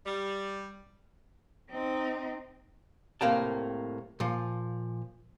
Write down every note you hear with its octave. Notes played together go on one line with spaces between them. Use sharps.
G3
C4 D#4
C2 A2 A#3 C4 G5 A5
A#2 F3